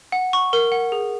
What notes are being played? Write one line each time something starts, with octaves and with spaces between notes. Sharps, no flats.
F#5
C#6
A#4
F#5
G#4